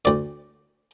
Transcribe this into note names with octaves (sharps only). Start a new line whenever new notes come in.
D2 D5